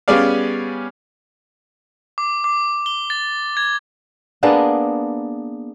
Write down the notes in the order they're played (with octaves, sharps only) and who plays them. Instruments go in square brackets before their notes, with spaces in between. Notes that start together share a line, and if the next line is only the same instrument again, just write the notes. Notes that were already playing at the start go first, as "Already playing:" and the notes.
[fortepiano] G3 B3 C#4 G#4 D5 F5
[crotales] D6
D6
G7
A6
G#6
[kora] A#3 B3 D4 G#4